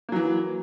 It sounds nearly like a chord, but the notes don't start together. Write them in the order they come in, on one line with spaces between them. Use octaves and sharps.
A#3 F#3 E3